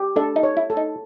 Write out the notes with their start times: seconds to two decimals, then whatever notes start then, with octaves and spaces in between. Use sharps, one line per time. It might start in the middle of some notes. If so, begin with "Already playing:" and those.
Already playing: G4
0.16 D4 A4
0.36 D#4
0.43 C#5
0.57 E4
0.70 A4
0.77 D#4